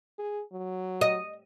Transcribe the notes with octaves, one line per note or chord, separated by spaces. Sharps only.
G#4
F#3
D#5